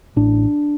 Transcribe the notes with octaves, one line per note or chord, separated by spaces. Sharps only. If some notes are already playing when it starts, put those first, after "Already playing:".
A1 D4